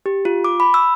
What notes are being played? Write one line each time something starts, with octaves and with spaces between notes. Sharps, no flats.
G4
F4
D6
B5
E6